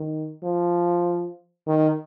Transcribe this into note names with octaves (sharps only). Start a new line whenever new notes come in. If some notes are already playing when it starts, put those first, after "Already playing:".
Already playing: D#3
F3
D#3